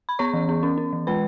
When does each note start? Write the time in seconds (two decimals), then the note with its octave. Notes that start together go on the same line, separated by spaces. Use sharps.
0.09 B5
0.19 B3 C#5 C#6
0.33 E3
0.49 B3
0.63 C#4
0.78 C#4
0.93 E3
1.07 G#3 B4 B5